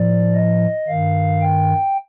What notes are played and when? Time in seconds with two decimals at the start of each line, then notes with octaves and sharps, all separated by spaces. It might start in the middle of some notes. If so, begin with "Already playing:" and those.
Already playing: A2 F3 D5
0.35 D#5
0.88 G2 D#3 F5
1.41 G5